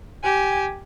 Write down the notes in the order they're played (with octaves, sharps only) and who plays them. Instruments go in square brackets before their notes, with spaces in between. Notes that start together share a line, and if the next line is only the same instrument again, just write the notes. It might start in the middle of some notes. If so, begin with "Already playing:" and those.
[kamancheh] G4 G#5